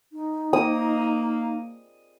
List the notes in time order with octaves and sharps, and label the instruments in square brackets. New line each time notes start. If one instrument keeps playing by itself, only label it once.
[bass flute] D#4
[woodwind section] A#3 [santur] D#6